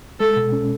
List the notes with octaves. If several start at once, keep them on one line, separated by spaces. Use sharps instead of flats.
G#3 A4
B2
C#4